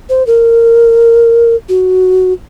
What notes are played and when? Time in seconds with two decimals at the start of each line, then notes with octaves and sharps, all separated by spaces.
0.09 C5
0.27 A#4
1.69 F#4